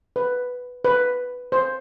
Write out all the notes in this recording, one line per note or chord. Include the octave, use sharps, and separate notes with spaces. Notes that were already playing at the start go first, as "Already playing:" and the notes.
B4
B4
C5